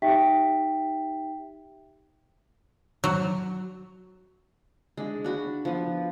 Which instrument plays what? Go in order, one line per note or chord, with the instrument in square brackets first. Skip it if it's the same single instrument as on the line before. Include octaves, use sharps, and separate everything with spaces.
[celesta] D#4 G4 E5 G5 B6
[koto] F#3
[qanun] G#3 D4
D4 F#4 B5
F3 B3